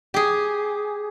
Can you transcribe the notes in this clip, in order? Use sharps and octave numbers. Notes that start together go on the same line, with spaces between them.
G4 G#4